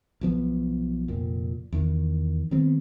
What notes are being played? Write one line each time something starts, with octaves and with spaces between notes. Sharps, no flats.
B1 F3 B3
F1 A#2
E2 D#3
D#3 G3 B3 C4